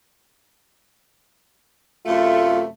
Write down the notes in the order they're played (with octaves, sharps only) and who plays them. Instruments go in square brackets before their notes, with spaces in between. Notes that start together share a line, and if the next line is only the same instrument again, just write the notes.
[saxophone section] F#2 C3 A3 [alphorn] F4